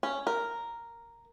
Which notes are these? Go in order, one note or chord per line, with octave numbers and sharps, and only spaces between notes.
C#4
A#4